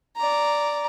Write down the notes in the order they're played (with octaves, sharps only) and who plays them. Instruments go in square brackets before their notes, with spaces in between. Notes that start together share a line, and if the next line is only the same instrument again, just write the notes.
[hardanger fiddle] D5 A#5